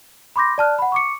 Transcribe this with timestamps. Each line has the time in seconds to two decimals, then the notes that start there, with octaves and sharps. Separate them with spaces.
0.36 B5 C6 D6 G6 A#6
0.58 D5 A5 F6 F#6
0.79 F#5 B5
0.92 C#6 D6 C#7